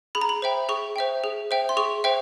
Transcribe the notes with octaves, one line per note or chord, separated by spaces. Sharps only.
G#4 B5
A#5
B5
C5 E5 G5
G#4 C#6
C5 E5 G5
G#4
C5 E5 G5
C6
G#4 C#6
C5 E5 G5